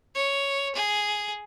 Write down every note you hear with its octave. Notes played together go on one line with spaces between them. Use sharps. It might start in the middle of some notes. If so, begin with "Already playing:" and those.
C#5
G#4